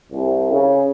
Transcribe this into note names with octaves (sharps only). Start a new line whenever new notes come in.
C2
C#3